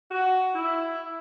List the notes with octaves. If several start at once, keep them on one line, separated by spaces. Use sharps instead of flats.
F#4
E4